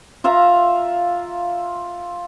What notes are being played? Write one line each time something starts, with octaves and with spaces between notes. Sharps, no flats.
F4 E5 F5 A#5